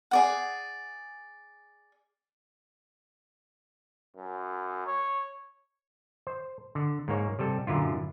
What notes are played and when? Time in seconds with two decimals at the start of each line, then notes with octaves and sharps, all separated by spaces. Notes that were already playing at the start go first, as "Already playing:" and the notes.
0.11 G#4 D5 F#5
4.16 F#2
4.87 C#5
6.27 C5
6.75 D3
7.08 G#2 A#3 C#5
7.39 C3 G3 A4
7.67 F#2 A#2 D3 E4 F4